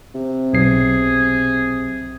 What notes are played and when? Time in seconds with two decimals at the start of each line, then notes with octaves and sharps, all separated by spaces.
0.15 C3
0.53 B1 G#4 C7